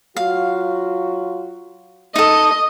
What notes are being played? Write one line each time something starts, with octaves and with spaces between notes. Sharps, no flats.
F#3 F4 F#4 F5
D#4 A4 D#5